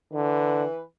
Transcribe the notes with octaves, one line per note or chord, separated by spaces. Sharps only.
D3 E3 B4